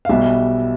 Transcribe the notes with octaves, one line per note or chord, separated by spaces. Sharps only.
F5
B1 B2 G3 E5